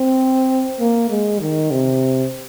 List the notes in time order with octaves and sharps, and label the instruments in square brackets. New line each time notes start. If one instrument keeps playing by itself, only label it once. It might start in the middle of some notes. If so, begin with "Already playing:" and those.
Already playing: [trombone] C4
A#3
G#3
D#3
C3